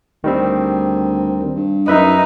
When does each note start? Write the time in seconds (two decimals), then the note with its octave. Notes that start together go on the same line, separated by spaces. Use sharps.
0.24 D2 D#3 G3 C4
1.55 G2
1.88 F#2 D#4 B4 E5